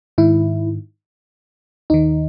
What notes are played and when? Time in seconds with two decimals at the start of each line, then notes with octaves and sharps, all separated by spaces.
0.18 G#2 D#3 E4
1.90 D#2 D#3 D#4